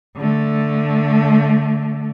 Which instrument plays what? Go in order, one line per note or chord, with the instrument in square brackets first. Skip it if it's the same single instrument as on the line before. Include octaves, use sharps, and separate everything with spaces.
[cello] D3 A3